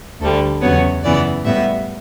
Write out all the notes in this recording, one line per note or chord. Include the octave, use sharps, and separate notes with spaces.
D2 D3 G3 A4
E2 C#3 F#3 B3 C#5
F#2 C#3 E3 B3 D5
A2 G3 B3 E5